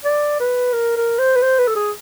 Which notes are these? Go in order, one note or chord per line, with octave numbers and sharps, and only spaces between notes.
D5
B4
A#4
A#4
C5
B4
C5
B4
A4
G#4